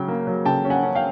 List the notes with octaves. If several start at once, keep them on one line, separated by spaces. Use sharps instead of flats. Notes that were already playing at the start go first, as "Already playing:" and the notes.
Already playing: C#3 F#3 G5
A#3
F#3
C#3 G5 A5
C#4
F#5 G#5
C#4
F5 G5